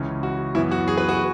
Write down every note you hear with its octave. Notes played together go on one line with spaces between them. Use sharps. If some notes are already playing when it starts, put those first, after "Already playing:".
Already playing: C#2 C#3 E3 C#4
F#4
F#2 E3 B3 E4
F#4
G#4
B4
F#4